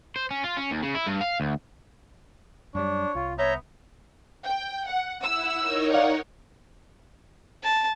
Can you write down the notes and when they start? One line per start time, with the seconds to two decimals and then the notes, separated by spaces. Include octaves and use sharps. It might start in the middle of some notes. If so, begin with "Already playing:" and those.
0.16 C5
0.31 C#4
0.44 F4
0.57 C#4
0.71 D#2
0.82 C#3
0.95 E4
1.06 G2
1.21 F5
1.40 D2
2.75 F#2 G3 D4 C#5
3.15 C2 F4
3.39 B3 C#5 E5 A#5 G6
4.45 G5
4.88 F#5
5.22 E4 F#5 E6
5.59 D#4 A#4 C#5
5.93 D5 F5 F#5
7.64 A5